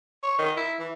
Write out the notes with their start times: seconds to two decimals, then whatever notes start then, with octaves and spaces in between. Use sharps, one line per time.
0.23 C#5
0.39 D#3
0.57 E4
0.80 E3